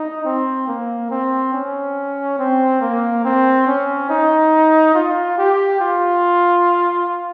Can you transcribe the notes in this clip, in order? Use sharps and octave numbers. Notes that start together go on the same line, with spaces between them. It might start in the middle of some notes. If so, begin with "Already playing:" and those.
Already playing: D#4
C4
A#3
C4
C#4
C4
A#3
C4
C#4
D#4
F4
G4
F4